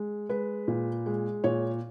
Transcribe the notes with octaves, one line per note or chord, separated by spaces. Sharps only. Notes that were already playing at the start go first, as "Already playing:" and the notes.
Already playing: G#3
G#3 B4
A#2
G#3
A#2 C#5